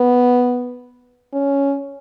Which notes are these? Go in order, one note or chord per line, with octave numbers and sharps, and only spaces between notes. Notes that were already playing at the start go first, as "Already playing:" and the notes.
Already playing: B3
C#4